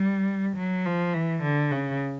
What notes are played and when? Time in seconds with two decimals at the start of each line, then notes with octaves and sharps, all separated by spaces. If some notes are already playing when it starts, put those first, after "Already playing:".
Already playing: G3
0.57 F#3
0.86 F3
1.14 E3
1.42 D3
1.71 C#3